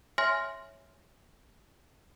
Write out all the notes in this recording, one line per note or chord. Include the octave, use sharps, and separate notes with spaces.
C#5 E5 G#5 C6 F6 A#6